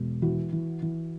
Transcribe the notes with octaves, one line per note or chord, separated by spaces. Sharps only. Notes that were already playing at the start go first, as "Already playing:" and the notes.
Already playing: E1
E3 F#4
E3
E3